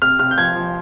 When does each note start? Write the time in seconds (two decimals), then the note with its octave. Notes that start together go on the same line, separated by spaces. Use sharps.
0.02 C3 F6
0.19 C3 F6
0.31 G6
0.38 F3 G#6
0.56 F3